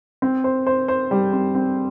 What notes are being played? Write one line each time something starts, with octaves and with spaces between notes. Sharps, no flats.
C4
C5
C5
C5
G3
C4
C4